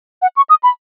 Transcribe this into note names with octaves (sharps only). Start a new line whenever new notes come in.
F#5
C#6
D#6
B5